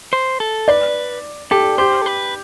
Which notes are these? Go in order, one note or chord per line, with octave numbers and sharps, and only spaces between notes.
C5
A4
B4 D5
G4 A4
G4 C5
A4
B4